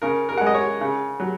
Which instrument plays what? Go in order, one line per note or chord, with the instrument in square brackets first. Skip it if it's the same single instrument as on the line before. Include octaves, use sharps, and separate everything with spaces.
[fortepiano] C#3 A#4
A#4
F#5
G#3
D#5
C#5
C#3
F#3